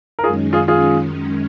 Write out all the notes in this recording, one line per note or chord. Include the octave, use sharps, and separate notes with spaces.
A#4
F#2 D#3 G#3 C#4 F4 G#4
F4 G#4
F4 G#4